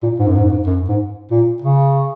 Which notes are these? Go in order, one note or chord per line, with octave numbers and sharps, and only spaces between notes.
A#2
G#2
F#2
G#2
F#2
G#2
F#2
G#2
A#2
C#3